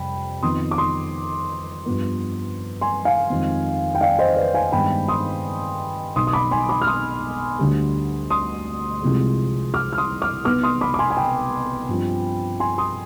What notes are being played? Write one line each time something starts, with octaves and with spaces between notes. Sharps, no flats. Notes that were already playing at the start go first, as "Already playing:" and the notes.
Already playing: F2 C3 G3 G5 B5
F2 D#3 B3 C6 D#6
D6
C6 D#6
G2 F3 B3
G#5 C6
F5 G#5
F2 D#3 G#3 C4
G5
D5 F5
C5 D#5
B4 D5
F5 G#5
G2 D#3 G#3 B3 G5 B5
C6 D#6
B1 B2 B3 C6 D#6
D#6
B5 D6
G#5 C6
B5 D6
F6
C6 D#6
D2 D3 G3
C6 D#6
C2 C3 F3 G#3
D6 F6
F6
C6 D#6
D6 F6
B1 B2 B3 D6 F6
C6 D#6
B5 D6
D6
G#5 C6
G#5
G5 B5
G2 F3 C4
G#5 C6
C6 D#6